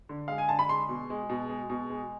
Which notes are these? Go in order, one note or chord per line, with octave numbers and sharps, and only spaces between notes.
D3
G#3 F5
G#5
D3 A5
B5
G#3 C6
B2
G#3
B2
G#3
B2
G#3